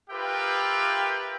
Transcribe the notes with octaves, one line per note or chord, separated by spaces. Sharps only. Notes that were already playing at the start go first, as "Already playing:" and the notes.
F4 G4 A#4 B4 E5 G5